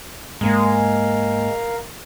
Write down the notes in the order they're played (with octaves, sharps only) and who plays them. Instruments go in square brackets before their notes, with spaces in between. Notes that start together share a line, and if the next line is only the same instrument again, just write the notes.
[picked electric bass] G#2 A#3 [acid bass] G#3 [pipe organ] A#4 F5